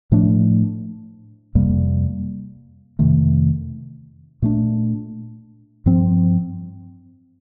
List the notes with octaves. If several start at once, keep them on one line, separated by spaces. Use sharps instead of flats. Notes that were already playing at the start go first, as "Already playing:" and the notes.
A2 F3 A3 D4
F2 C3 G3 A#3
F2 C3 D#3 A3
A#2 A3 D4
G2 F3 C4